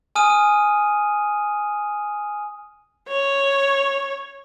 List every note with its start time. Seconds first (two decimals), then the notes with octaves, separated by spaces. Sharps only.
0.15 G#5 D#6 F6 D#7
3.08 C#5